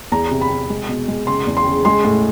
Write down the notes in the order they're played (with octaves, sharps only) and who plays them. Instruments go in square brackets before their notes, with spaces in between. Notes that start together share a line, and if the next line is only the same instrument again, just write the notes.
[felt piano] E2 A#5
C3
B5
C3
G#3
B2
G#3
C#3 C6
E2
C6
C#3
G#3 C6
A2